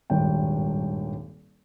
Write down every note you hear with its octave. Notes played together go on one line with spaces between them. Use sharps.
D#1 G#1 G2 G5